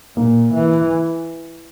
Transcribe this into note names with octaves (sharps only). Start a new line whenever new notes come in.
A#2 A#3
E3